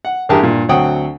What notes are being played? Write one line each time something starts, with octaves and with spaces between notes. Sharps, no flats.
F#5
A1 G2 G4 G#4 A#4 A5
G2 A#2
D2 F#3 C4 F#5 G5 D#6